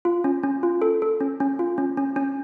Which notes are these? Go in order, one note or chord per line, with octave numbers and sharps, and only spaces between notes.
F4
C#4
C#4
F4
A4
A4
C#4
C#4
F4
C#4
C#4
C#4